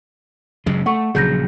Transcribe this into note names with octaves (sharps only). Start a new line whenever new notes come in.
F#2 C#3 G#3
A3 F#5 C#6
A#1 C#3 F#3 G#4 G6 A#6